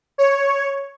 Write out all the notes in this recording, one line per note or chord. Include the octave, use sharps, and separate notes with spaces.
C#5